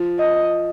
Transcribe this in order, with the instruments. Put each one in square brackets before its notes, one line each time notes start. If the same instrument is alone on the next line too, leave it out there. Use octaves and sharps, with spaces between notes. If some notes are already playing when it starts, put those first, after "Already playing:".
Already playing: [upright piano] F3
[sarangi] D#5